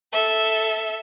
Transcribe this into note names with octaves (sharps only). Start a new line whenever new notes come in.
A4 E5